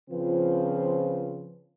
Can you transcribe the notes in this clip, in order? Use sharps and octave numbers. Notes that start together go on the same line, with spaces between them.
C#3 F3 C4 F4 B4